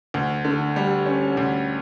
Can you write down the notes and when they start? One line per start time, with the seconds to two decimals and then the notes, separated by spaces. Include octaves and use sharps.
0.14 D2
0.45 D3
0.76 G3
1.06 C#4
1.37 D2